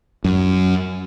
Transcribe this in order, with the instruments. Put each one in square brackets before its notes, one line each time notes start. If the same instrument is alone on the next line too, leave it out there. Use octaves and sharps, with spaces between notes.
[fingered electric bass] F#2